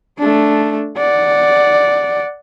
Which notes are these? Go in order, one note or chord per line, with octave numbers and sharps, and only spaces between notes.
A3 D4
D5 F#5